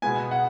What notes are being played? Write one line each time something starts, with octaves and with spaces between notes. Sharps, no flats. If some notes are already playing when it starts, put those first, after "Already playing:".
B2 G#3 B3 G#5
F#5